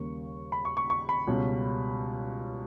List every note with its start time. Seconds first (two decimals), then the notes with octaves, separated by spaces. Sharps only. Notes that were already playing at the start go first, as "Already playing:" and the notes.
Already playing: D#2 C#3 G3 A#3 C#6
0.52 B5
0.65 C#6
0.77 C#6
0.90 C#6
1.09 B5
1.27 C#2 B2 G3 C#4